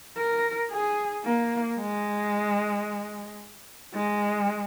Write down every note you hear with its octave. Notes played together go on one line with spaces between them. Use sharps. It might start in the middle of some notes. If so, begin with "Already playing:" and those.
A#4
G#4
A#3
G#3
G#3